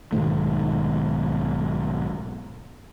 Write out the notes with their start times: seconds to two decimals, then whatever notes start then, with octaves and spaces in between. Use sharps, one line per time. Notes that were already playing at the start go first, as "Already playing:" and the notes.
0.12 B1 G#2 D#3 A3